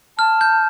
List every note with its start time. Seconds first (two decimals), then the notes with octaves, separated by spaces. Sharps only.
0.18 A5 F6
0.41 G6